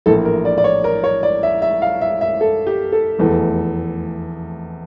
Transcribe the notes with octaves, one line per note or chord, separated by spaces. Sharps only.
A#1 A2 E3 A#3 A4
A#4
D5
D5
C#5
A#4
C#5
D5
E5
E5
F5
E5
E5
A4
G4
A4
F1 E2 E3 A3